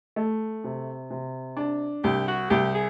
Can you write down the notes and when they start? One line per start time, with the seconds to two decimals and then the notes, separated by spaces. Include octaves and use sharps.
0.16 A3
0.64 C3
1.11 C3
1.57 D4
2.04 C2 G4
2.28 F#4
2.50 C2 G4
2.74 G#4